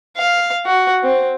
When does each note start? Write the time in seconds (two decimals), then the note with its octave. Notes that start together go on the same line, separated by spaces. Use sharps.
0.18 F5
0.67 F#4
1.03 C4